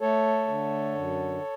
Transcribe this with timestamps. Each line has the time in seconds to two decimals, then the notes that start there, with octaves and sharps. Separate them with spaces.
0.01 A3 A4 C#5
0.48 D3
0.95 F#2